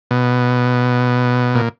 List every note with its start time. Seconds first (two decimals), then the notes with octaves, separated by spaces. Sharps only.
0.11 B2
1.55 A#2